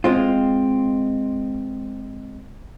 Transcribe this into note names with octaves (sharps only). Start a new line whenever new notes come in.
G#3 C4 F4